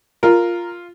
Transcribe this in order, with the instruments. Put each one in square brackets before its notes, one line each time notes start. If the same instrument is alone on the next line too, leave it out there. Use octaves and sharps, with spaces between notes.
[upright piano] F4 A#4